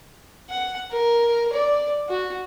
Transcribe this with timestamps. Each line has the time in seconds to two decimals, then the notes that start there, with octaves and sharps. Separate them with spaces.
0.50 F#5
0.91 A#4
1.53 D5
2.09 F#4